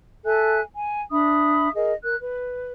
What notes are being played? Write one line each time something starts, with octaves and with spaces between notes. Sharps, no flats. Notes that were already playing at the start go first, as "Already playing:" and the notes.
A4 E5 G#5 F#6
G#5
D4 E5 B5 D#6
G#4 A#4 D#5
A#4 F#6
B4